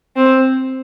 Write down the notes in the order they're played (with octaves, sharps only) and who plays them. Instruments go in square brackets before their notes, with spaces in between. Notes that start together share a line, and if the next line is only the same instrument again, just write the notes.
[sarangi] C4